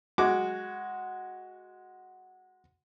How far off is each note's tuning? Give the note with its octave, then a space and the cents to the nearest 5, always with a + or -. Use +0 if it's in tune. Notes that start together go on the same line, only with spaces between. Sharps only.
G#3 +0 F#4 +0 D6 +0